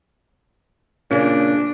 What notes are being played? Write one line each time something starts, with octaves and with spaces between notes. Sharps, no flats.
A#2 C#3 D4